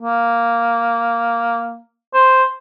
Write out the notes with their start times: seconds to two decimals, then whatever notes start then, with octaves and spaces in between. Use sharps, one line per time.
0.02 A#3
2.14 C5